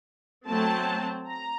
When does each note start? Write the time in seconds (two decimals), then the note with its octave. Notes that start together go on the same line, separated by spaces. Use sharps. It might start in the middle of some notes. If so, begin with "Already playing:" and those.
0.48 F#3 A3 C4 A5
1.26 A#5